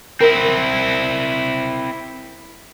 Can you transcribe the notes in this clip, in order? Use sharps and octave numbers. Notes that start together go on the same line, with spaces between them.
C4 E4 A#4